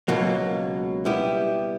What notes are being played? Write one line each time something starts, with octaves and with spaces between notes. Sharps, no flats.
C#2 B2 F#3 A#3
G3 B3 E4 G4